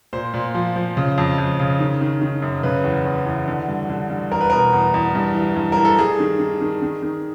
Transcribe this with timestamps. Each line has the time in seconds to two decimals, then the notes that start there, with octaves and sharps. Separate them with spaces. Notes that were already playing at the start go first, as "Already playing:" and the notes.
0.13 A#2 C5
0.34 A#2
0.54 F3
0.76 F3
0.97 C#3
1.18 F2
1.38 F2
1.60 C#3
1.79 D#3
2.01 D#3
2.22 D#3
2.42 F#2
2.63 C#3 B4
2.84 E2
3.05 E2
3.26 E2
3.48 D3
3.68 G2
3.90 D3
4.10 G2
4.31 E2 A#4
4.41 B4
4.50 B2 A#4
4.73 E2
4.94 E2
5.15 G2
5.35 E3
5.56 G2
5.72 E3 A#4
5.85 A4
5.99 G2 G#4
6.20 D#3
6.40 D#3
6.61 D#3
6.82 D#3
7.03 D#3